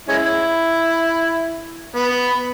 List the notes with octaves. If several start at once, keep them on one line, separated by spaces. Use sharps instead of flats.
G#3 C#4 E4
B3